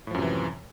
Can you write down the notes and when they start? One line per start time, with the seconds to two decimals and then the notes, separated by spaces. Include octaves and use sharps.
0.07 A2
0.11 F3
0.15 F#2
0.18 C3
0.22 E3